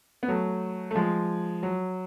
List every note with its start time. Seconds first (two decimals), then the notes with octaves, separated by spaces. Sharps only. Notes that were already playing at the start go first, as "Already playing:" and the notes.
0.23 B3
0.28 F#3 A3
0.91 A3
0.95 F3 G#3
1.63 F#3